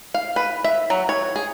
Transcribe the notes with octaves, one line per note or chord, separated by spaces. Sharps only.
F5
B4
E5
F#3
C#5
G#4